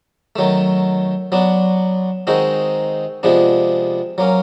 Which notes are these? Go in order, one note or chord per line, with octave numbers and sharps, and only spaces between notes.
D#3 F#3 A3
F#3 B3 D4
D#3 G#3 C4 D#4 F#4
C3 F3 G#3 B3 D4
F#3 A#3 C#4